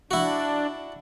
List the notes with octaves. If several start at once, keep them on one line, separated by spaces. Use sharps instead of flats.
D4 E4 F#4